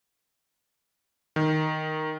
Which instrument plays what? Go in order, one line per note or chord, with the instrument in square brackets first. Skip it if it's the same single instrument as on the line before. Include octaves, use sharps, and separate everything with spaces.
[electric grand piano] D#3